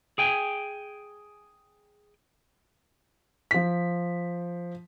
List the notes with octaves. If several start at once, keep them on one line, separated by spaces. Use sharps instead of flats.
G#4 G5 G#5
F3 B6